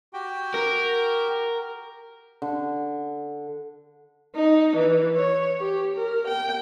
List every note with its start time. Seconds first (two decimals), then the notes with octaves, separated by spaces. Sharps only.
0.13 F#4 G4 G5
0.54 A#4
2.42 D3
4.36 D#4
4.76 E3
5.15 C#5
5.59 G4
5.96 A#4
6.27 G5